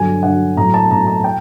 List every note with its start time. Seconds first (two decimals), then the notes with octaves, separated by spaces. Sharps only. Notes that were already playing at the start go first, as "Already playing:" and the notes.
Already playing: G2 D3 F#3 G#5
0.23 G2 D3 F#3 F#5
0.56 A2 F#3 A#5
0.74 A5
0.91 A2 F#3 A#5
1.07 A5
1.24 G5